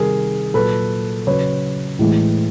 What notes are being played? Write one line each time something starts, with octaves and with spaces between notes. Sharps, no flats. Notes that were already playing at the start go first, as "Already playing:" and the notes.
Already playing: C3 D#3 G3 G#4 A#4
A#2 F#3 A4 B4
C#3 F#3 B4 C#5
A2 E3 G#3